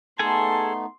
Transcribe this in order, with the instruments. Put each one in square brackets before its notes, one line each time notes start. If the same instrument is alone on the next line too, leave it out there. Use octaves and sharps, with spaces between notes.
[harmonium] A3 B3 D#4 [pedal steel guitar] G#4 A4 G#5 [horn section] A5 [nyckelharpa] C6